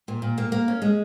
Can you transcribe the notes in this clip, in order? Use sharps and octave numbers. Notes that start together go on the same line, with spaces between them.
A#2
A#2
A#3
A#3
C#4
G#3